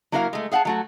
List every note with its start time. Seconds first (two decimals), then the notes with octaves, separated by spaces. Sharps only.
0.12 F#3 A#3 E4 A#4 B4 F5
0.33 G#3 A3
0.52 G#4 F5 F#5 G#5 A5
0.65 F#3 A3 F#4